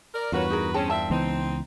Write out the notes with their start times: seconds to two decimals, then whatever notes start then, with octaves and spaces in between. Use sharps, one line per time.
0.14 A#4 D5
0.32 E2 G2 F4 F#4 A#4 B4 C#5
0.50 D#4 G#4 A#4
0.74 C4 C#4 G#4 G5 A5
0.90 A#2 C4 E5 A5
1.10 C#2 E3 B3 C4 D#4